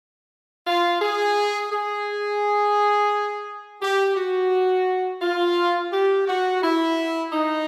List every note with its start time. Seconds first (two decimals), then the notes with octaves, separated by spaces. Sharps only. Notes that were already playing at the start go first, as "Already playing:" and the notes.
0.66 F4
1.01 G#4
1.71 G#4
3.82 G4
4.17 F#4
5.22 F4
5.92 G4
6.27 F#4
6.62 E4
7.32 D#4